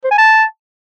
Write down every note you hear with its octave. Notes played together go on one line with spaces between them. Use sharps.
C5
G#5
A5